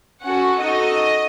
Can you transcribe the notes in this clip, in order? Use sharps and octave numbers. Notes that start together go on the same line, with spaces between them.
C#4 F#4 A4 F#5
D#4 F#4 A4 D#5